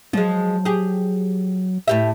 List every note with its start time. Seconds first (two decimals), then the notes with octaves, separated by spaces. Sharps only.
0.13 F3 F#3 G#3
0.65 G4 G#4
1.88 A2 G4 E5